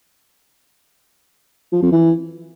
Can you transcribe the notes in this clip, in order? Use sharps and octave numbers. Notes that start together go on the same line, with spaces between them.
F3
F2
E3